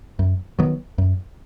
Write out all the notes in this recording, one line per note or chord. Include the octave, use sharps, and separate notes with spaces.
F#2
D#3 F#3 B3
F#2